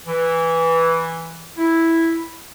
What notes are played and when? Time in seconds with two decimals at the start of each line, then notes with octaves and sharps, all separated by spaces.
0.06 E3
1.58 E4